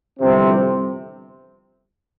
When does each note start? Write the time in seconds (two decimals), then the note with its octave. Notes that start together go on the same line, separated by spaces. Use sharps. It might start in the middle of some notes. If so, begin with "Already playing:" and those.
0.19 G1 F2 C3 E3 G3 C4